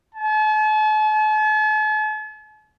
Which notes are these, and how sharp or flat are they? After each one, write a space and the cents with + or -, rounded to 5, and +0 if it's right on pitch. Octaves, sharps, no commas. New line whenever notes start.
A5 -45